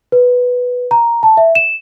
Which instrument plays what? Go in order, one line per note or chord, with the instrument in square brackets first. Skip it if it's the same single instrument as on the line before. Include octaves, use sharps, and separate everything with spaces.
[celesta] B4
A#5
A5
E5
E7